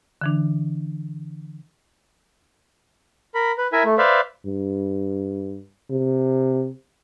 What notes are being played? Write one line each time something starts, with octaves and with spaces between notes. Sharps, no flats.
D3 E3 D4
A#4 B5
B4
E4 A#4 E5 G#5
A3
B4 C5 D5 E5 F5
G2
C3